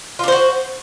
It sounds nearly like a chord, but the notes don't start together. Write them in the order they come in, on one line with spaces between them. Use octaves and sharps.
F4 D4 C5 F#4